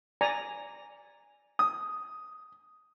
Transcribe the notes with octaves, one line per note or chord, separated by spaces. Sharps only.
D5 G#5 A#5
D#6